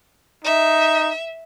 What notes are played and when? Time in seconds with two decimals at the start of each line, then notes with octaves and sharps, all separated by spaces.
0.44 D#4 E5